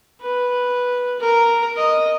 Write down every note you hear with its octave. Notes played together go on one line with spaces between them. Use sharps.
B4
A#4
D#5